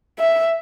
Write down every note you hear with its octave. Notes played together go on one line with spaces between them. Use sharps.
E5